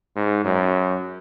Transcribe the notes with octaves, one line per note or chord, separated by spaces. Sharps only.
G#2
F#2